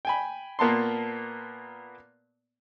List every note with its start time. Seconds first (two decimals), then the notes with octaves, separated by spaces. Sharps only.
0.05 G5 G#5 B5
0.59 A#2 A#3 B3 A5 C6